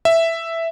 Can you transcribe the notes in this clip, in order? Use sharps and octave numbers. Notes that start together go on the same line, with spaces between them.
E5